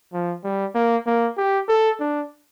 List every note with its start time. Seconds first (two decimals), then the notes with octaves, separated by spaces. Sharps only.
0.13 F3
0.44 G3
0.75 A#3
1.06 A#3
1.37 G4
1.69 A4
2.00 D4